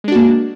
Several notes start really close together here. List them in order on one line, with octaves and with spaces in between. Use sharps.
G#3 D4 F#4 A#3